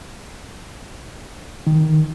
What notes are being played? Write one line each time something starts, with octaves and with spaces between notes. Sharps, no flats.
D#3